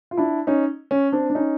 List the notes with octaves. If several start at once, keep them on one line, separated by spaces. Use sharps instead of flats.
F4
D4 E4
C#4 D#4
C#4
C4 D4
D4
C#4 D#4